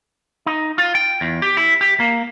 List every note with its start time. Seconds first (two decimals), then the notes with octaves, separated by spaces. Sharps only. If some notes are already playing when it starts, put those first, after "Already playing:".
0.46 D#4
0.78 F4
0.95 G5
1.21 E2
1.42 G4
1.57 E4
1.81 G4
2.00 A#3